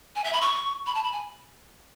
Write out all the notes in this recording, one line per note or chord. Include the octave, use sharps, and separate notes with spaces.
G#5
E5
B5
C#6
B5
A5
B5
G#5